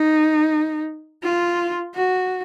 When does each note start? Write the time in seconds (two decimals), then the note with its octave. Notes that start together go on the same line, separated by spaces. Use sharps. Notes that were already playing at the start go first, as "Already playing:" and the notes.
Already playing: D#4
1.23 F4
1.95 F#4